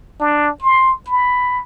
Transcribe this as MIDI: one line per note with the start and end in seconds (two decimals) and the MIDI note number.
0.21 0.50 62
0.62 0.95 84
1.07 1.62 83